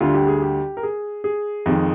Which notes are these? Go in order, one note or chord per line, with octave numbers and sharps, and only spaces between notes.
D2 D3 G3 F4
G4
G#4
G4
A#4
G#4
G#4
F2 D#3 G#3